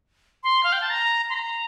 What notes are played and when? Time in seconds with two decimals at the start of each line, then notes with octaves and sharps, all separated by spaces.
0.43 C6
0.64 F5
0.72 G5
0.81 A5
0.90 A#5
1.30 C6
1.34 A#5